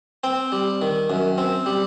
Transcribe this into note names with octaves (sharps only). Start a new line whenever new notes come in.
C4 G5
G3
D#3
F#2
C4
G3